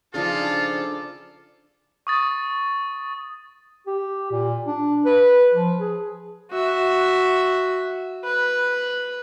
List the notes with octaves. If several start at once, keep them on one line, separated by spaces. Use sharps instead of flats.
C#3 F3 D4 D#4 F4 G#4 A4 D5
C#6 D#6 A6
G4
A#2
D4
B4
F3
G#4
F#4 E5
B4